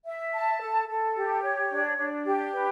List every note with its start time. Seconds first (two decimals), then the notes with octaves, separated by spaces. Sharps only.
0.05 E5
0.33 A5
0.61 A4
0.88 A4
1.16 G4
1.43 C#5
1.71 D4
1.98 D4
2.26 G4
2.53 B4